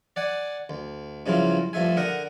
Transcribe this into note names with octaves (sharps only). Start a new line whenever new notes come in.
D5 F#5 G#5
D2
G2 C#3 F3 F#3 E4 F4
G2 F3 A3 E5 G#5
D3 A#4 F#5 A#5 D#6